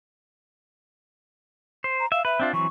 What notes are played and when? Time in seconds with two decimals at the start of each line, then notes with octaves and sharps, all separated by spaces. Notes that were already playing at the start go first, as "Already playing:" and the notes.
1.84 C5
1.99 A#5
2.12 E5 F5
2.25 B4 E5
2.40 C4 D4 F4
2.53 E3 F#3 C4 C#6